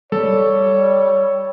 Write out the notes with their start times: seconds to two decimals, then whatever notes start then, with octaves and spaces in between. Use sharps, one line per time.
0.12 G3 A4 C#5